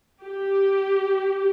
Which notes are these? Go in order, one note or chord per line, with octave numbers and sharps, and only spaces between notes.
G4